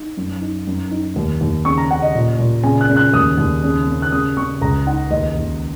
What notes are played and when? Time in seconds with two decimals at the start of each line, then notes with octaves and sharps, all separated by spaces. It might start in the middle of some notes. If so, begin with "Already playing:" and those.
Already playing: D#4
0.17 F#2
0.41 D#4
0.67 F#2
0.91 D#4
1.16 D#2
1.41 D#2
1.65 C#3 C#6
1.78 A#5
1.90 C#3 F#5
2.02 D#5
2.14 A#2
2.39 A#2
2.63 C#3 G#5
2.81 F#6
2.89 C#3
2.97 F#6
3.13 D#2 D#6
3.38 D#2
3.63 C#3
3.87 C#3
4.02 F#6
4.12 C#3 D#6
4.37 C#3 C#6
4.61 C#2 A#5
4.87 D#4 F#5
5.11 D#2 D#5
5.36 D#2